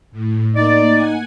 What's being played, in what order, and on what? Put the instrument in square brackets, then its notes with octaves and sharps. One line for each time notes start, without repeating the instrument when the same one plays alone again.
[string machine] A2
[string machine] A#3 [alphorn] D#4 [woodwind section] D5
[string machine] F#5 G#5